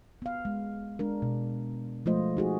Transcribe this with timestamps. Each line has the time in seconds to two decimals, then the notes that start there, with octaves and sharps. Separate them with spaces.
0.22 B3 F5
0.45 G#3
0.99 G#3 D4 A#4
1.22 B2
2.06 F3 G#3 A3 F4 C5 D#5
2.37 D#4 F#4 G#4